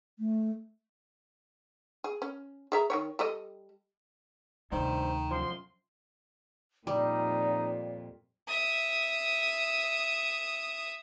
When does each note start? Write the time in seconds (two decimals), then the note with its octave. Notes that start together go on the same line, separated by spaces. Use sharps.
0.19 A3
2.04 G#4
2.22 C#4
2.72 G#4 E5 A#5
2.90 D#3 B3 C#5
3.19 G3 A4 D#5
4.72 D2 G2 C3 D#3 C5
5.31 F#2 F3 C6
6.87 F2 A#2 G3 D#4 D5
8.48 E5 D#6